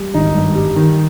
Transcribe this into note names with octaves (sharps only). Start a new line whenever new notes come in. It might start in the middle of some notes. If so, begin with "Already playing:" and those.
Already playing: G3
G#1 D#4
G2
G3
D#3